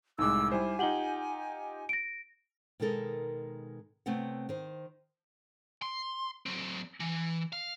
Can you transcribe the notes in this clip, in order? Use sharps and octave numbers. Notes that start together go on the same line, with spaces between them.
C2 A2 G#3 D#4 D6 E6
G3 E4 C5 G#5
D#4 F4 G4 F#5 F#7 G7
A#6 D7
B2 D#3 G#3 D#4 A4 A#4
C3 A3 B3 C4 C#5 F#5
D#3 C5
C6
F#3 C4
E3
F5